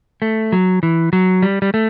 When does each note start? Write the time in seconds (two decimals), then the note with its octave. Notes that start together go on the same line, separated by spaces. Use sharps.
0.22 A3
0.52 F#3
0.83 E3
1.13 F#3
1.43 G3
1.62 G3
1.74 A3